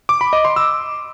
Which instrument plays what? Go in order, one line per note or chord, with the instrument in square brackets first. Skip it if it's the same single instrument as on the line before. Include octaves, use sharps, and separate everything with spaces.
[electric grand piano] D6
B5
D#5
C6
E6